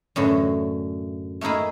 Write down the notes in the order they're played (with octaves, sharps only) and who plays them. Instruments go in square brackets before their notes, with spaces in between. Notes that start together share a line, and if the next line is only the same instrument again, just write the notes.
[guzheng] F#2 A2 D3 E3
A3 A#3 D#4 E4 G#4